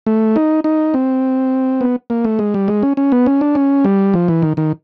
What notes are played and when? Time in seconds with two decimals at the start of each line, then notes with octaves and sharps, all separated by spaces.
0.07 A3
0.36 D#4
0.64 D#4
0.94 C4
1.81 B3
2.10 A#3
2.25 A3
2.39 G#3
2.54 G3
2.68 G#3
2.83 C#4
2.97 C#4
3.12 B3
3.26 C#4
3.41 D4
3.55 C#4
3.84 G3
4.14 F3
4.28 E3
4.42 D#3
4.57 D#3